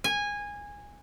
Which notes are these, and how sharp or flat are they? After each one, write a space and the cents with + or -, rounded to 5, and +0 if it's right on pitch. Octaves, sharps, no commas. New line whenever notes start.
G#5 -15